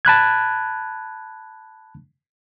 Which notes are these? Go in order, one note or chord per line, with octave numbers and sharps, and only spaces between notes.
A5 B5 F#6 G#6